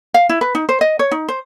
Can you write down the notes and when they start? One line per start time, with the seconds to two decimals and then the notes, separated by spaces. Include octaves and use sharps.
0.14 F5
0.29 E4
0.41 B4
0.55 D#4
0.69 C5
0.81 D#5
0.99 C#5
1.11 D#4
1.28 C5